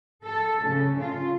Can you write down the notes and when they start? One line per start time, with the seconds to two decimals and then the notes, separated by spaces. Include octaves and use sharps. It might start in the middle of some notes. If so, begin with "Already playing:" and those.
0.24 A4
0.68 C#3
1.00 F4